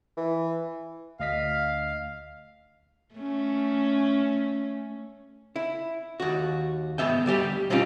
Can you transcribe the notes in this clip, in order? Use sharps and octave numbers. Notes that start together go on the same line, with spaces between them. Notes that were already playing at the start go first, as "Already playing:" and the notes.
E3
D2 D#5 F5 B6
A3 C#4
E4
D#2 F#4
G#2 A#3 B3 E5 G5
D2 G3 G4 G5
B2 C4 C#4 D#4 F4 G4